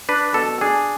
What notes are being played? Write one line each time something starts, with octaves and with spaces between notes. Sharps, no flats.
D4 B4
B2 A4
D4 G#4